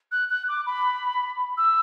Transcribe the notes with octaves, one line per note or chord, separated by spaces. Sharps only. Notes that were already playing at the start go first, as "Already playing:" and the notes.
F#6
F#6
D6
B5
E6